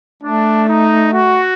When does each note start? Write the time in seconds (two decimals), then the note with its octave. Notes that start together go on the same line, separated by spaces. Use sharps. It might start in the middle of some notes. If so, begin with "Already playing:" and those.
0.22 A3 D4
0.68 D#4
1.12 F#4